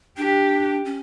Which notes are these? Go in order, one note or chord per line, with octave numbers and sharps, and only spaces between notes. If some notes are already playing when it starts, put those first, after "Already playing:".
D4 G4
C#4